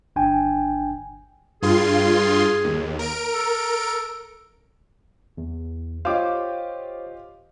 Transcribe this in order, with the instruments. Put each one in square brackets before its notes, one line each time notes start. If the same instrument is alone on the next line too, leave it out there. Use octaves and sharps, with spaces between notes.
[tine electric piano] G1 D4 G5 G#5
[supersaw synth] G2 F4 C6 [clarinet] G#4
[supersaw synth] D#2
A#4 D7
[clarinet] A4
[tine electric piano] E2
[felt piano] F4 G4 D#5 [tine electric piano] C5 C#5 [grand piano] F5 D6